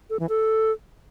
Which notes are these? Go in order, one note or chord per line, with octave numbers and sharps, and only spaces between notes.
A4
E3
A4